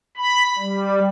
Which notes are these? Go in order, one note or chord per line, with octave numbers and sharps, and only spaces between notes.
B5
G3